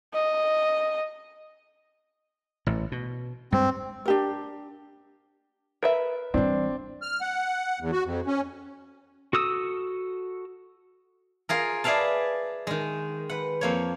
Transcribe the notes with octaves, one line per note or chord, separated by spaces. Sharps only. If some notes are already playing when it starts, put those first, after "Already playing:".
D#5
A1 A2
B2
G2 G#3 C4
D4 G4 A#4
A#4 B4 E5
E3 G3 C4 D4
F6
F#5
E2
F#4
F2
C#4
F#4 A4 D#6 E6
F4 G#4 A#4
G#4 B4 D5 E5 F5 A5
D#3 G#3
B4 F#5
F2 A#3 C#5